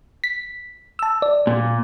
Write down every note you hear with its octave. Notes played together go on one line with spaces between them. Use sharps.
B6
A5 E6
D5
A#2